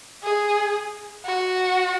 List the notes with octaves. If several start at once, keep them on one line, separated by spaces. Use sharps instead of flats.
G#4
F#4